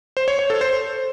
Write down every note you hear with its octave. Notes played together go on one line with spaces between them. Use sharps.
C5
C#5
C#5
A4
C5